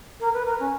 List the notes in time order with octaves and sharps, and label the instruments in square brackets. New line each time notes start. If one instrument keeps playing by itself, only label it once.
[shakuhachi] A#4
B4
A#4
C#4